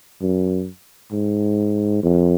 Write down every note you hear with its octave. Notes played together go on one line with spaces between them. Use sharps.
F#2
G#2
F2